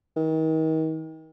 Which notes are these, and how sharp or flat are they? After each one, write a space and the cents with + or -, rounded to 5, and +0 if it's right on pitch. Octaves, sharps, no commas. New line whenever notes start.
D#3 +35